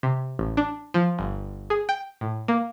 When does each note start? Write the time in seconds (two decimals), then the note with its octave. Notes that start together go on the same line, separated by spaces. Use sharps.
0.03 C3
0.39 A1
0.57 D4
0.94 F3
1.19 G1
1.70 G#4
1.89 G5
2.21 A2
2.48 A#3